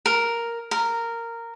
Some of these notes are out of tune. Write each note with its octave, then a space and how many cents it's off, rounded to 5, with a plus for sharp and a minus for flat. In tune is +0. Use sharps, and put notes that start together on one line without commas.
A#4 +0
A#4 -10